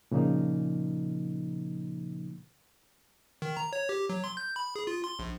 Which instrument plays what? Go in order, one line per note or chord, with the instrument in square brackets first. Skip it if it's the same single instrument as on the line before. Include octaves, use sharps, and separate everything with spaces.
[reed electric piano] A#2 C#3 F3 A#3 D#4
[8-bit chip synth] D#3
A#5
C#5
G4
F#3
C6
G6
B5
G#4
F4
C6
A#1